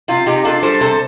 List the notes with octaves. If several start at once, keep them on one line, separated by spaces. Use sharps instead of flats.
C3 F4
C3 D#4 G4
D4 F4 A4
G3 A4 C5
C3 A4 C5